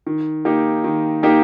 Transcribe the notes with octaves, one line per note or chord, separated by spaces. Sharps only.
D#3
A#3 D#4 G4
D#3
A#3 D#4 G4